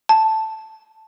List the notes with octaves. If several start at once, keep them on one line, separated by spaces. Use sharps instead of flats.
A5